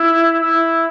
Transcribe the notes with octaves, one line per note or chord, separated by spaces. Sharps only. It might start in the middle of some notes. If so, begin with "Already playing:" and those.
Already playing: E4
E4